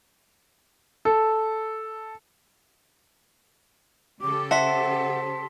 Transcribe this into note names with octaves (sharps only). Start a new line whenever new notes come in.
A4
C#3 G4 A4 D6
C5 E5 F#5 A5 C6 B6